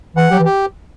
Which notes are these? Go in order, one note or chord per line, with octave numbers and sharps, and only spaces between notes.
E3 F#5
F#3 G4
E3
G4